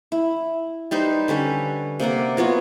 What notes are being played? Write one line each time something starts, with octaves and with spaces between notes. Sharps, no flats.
E4
G3 D#4 B4 C5
D3 G3 C#4 B4
C3 A#3 D5 F#5
F#3 B3 F4 F#4